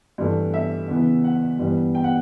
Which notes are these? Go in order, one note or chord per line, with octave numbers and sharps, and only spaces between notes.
G2 E3 A3
E5
E2 C#3 E3 B3
F#5
G2 E3 G3 B3
G5
F#5